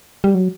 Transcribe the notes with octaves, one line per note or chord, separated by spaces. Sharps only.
G3
F#3